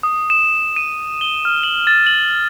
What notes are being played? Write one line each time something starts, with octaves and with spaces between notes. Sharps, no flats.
D#6
E7
D#7
G7
F6
F#7
A6
F#7